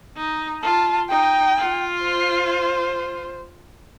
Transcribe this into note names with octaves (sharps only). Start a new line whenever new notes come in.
D#4
F4 A5
D#4 G5
F4
C5